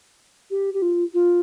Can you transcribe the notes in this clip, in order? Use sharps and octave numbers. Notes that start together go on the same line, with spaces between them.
G4
G4
F4
F4